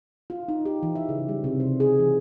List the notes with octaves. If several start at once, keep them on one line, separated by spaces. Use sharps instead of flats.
F4
D#4
G4
E3
E5
C#3
G3
C3
C5
G#4
E3